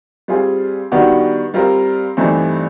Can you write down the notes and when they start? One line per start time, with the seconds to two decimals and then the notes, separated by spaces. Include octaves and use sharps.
0.28 G3 C4 F4 G#4
0.92 D#3 G3 B3 D4 F#4
1.54 G3 C4 F4 A#4
2.17 G2 E3 A3 C4 D#4